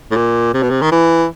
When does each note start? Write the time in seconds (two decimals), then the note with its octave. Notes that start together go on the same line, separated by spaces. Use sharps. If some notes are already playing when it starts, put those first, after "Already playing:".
0.11 A2
0.16 A#2
0.54 C3
0.63 B2
0.70 C3
0.82 D#3
0.92 E3